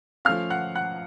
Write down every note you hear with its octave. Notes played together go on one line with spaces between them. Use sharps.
F3 A3 C#4 F5 F6
F#5 F#6
F#5 F#6